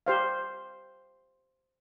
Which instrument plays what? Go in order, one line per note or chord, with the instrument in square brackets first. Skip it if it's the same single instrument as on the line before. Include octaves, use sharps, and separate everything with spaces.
[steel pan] G4 C5 F5